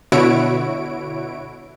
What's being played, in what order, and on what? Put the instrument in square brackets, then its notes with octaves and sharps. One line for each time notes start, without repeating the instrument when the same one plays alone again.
[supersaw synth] B2 D3 E4 F#4 C#5 D7